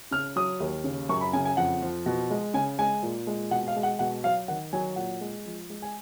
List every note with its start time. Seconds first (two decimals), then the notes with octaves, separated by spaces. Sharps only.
0.11 C#3 F6
0.36 F#3 D#6
0.60 D#2
0.84 C#3
1.09 F#2 C#6
1.21 B5
1.33 C#3 G#5
1.45 G#5
1.57 F2 F#5
1.82 F3
2.06 B2
2.30 G#3
2.54 C#3 G#5
2.78 G#3 G#5
3.03 A#2
3.27 G#3
3.51 B2 F#5
3.68 F5
3.76 G#3
3.83 F#5
3.99 B2 F#5
4.24 F#3 F5
4.48 D#3 F#5
4.73 F#3 G#5
4.96 A#2 F#5
5.21 G#3
5.46 F3
5.70 G#3
5.82 G#5